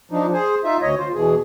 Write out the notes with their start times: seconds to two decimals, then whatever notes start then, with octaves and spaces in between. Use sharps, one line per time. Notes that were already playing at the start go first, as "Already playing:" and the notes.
0.11 F3 D4 D#4
0.33 G#4 C5
0.64 D#4 F4 E5
0.82 D2 C#5 D#5
0.98 F4 C5
1.14 E2 B2 E3 G#4